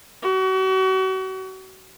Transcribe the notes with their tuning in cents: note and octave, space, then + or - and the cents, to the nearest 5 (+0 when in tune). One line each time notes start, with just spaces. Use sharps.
F#4 +35